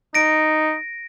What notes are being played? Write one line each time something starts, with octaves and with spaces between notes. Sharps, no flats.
D#4 A#6 D7